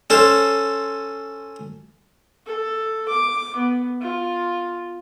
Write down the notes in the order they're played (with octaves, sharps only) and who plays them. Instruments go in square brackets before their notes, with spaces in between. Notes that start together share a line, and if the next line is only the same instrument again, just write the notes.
[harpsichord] C#4 A4 C5
[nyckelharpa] A4
D6
B3
F4